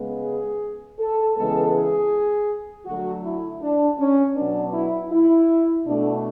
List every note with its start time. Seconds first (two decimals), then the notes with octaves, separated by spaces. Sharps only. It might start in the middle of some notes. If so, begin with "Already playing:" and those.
Already playing: C#3 G#3 B3
0.23 G#4
0.99 A4
1.36 C#3 E3 G#3 B3 A4
1.74 G#4
2.85 D3 F#3 A3 F#4
3.23 E4
3.61 D4
3.98 C#4
4.36 B2 F#3 B3 D4
4.74 E4
5.12 E4
5.86 B2 A3 D4